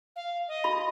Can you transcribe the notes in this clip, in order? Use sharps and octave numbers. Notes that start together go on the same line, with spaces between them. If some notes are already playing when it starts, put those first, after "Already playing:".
F5
D#5
F#4 B5